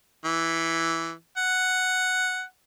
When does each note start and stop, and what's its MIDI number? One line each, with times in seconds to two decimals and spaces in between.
0.25 1.12 52
1.38 2.43 78